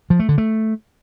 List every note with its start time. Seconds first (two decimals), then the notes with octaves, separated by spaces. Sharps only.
0.10 F3
0.19 A3
0.29 D3
0.38 A3